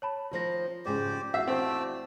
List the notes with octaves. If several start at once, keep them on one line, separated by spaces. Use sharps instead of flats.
C#5 A5 B5
D#3 F3 C4 F4 A#6
F2 G#2 C#3 G4 C5 D5
E2 F#4 E5 F5 E6
A3 C4 D5 E6